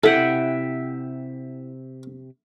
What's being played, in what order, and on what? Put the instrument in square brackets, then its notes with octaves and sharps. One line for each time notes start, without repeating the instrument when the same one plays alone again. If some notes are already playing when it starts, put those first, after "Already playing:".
[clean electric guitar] C3 E5 G5 [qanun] E4 F#5 [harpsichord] A4